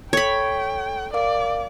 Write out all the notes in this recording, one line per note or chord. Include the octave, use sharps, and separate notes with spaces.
A4 C#5 G5 B5
A#4 D5 F5 D6